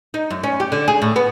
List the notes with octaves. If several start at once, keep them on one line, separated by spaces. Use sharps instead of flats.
D#4
F#2
C#4
G4
D3
G#4
A2
B3